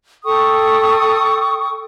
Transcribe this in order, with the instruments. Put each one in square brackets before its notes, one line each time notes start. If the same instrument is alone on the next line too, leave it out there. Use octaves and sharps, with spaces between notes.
[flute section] A4 G5 C#6 D#6